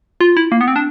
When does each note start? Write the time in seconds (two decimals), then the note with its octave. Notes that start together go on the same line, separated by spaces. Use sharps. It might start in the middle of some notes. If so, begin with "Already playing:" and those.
0.21 F4
0.37 E4
0.52 A#3
0.61 B3
0.68 C4
0.76 D4